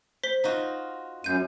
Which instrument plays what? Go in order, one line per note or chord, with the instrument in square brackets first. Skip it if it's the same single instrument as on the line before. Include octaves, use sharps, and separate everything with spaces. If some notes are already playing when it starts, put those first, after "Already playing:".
[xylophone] C5 B6 G7
[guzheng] D#4 F4 F#4
[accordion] F#2 [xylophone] G6 D#7